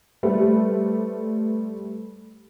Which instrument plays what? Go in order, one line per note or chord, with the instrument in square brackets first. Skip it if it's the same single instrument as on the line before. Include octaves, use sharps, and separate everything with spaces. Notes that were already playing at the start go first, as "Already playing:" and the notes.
[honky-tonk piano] G3 A3 G4 B4 C5